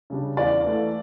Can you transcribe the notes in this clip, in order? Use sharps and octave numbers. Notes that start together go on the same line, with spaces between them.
C#3 G3 D4
E2 D5 F5
E3 A3